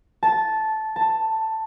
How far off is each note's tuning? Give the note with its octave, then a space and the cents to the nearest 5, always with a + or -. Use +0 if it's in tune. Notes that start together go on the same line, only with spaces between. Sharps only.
A5 -10
A5 +10